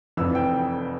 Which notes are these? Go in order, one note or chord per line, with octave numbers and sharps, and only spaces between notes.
F1 F2 E3 E6
G5